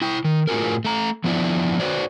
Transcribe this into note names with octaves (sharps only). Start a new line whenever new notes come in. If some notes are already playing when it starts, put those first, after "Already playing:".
E4 G5
D#3
A2 F4 F#4 G#4 A#4
A3 A#5
F3 B3 D4 E4 D5 E5
F#4 B4 C5 D5